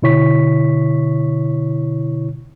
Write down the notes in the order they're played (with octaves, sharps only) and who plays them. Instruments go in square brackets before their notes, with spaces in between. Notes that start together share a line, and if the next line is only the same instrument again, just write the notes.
[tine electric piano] B2 D3 E4 C#5 C#6 B6